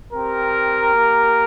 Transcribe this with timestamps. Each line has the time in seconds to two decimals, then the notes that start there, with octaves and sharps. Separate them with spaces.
0.12 C4 G4 A#4
0.94 A#3 G4